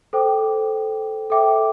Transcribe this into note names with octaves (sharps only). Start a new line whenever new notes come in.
A4 C5 G5 D6
A4 E5 G5 D6